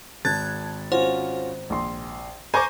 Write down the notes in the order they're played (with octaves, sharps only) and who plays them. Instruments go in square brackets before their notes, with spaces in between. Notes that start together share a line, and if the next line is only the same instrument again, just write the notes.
[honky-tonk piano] G#1 [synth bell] A5 F#6 G#6 [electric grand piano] A6
[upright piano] C#4 F4 F#4 [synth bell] C5
[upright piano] A#1 C6
[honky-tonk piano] C5 [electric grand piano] G#5 C#6 D6 [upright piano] A#5 G6 A#6